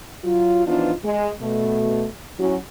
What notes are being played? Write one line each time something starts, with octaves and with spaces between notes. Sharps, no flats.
F#3 F4
E3 F3 B3 D4 D#4 F4
G#3
B2 A3
F#3 C#4 E4 F#4